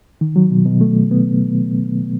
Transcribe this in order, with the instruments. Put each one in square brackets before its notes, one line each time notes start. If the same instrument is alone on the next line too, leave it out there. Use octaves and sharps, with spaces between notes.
[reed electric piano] D#3
F#3
B2
B2
A3
B3